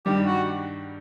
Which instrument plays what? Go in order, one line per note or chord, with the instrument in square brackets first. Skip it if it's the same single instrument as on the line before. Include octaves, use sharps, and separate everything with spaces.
[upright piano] G2 D#3 G3 [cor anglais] G4
[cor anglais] F#4